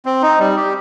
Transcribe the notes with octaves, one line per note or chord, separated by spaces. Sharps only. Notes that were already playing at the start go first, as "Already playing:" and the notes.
C4
D#4
G3
G4